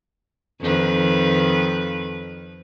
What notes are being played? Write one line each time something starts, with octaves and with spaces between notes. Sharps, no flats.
F2 D#3 B4